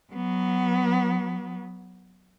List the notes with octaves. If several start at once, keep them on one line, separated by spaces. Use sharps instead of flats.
F#3 B3